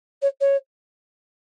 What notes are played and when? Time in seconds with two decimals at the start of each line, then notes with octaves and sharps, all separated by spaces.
0.22 C#5
0.40 C#5